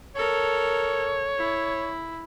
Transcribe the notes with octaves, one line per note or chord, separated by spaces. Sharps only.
A4 A#4 C#5
E4